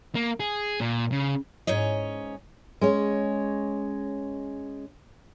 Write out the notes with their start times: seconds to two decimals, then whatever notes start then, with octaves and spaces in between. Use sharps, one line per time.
0.15 A#3
0.40 G#4
0.80 A#2
1.12 C#3
1.67 G#2 C#4 C#5 D#5
2.81 G#3 C#4 C#5